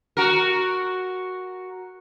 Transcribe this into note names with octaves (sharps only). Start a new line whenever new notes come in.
F#4 A#4